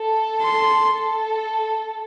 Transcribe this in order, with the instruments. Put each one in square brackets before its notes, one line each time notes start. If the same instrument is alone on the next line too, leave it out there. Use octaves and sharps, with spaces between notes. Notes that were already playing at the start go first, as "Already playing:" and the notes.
Already playing: [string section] A4
[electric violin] C6
[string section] A4